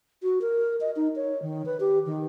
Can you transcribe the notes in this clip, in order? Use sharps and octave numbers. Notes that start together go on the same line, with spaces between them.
F#4
A#4
D#5
D#4
C#5
D#3
B4
G4
D#3